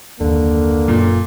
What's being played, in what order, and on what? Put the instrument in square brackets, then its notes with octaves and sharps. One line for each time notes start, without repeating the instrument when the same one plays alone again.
[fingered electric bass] F#1 D#2 [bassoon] D3 [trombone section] A#3
[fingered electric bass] F#1 F#2 C#4 [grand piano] A#2